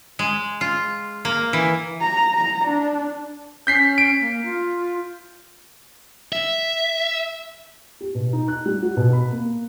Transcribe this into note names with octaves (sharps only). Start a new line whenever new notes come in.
G#3
F4
A#3
E3
A#5
A#5
D4
C#4 G6 B6 C7
D7
A#3
F4
E5
G4
B2
D#4
F#6
G3
F#4
B2
B5
A#3